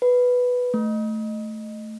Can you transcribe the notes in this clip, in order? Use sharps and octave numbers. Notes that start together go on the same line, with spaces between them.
B4
A3